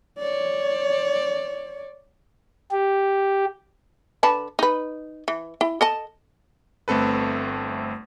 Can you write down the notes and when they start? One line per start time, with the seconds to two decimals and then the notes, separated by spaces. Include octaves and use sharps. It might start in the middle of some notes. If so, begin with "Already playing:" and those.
0.19 C#5 D5
2.71 G4
4.23 D3 B4 A5
4.59 D#4 B4
5.28 E3
5.61 E4
5.81 A4 D#5 A5
6.88 G1 A3 C4 A4 B4